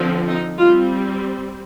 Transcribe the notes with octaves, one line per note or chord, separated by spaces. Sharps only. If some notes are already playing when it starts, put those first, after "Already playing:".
Already playing: D3 F3 C4
D#4
G3 C4 F4